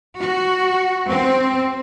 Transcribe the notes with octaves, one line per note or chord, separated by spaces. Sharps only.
F#4
C4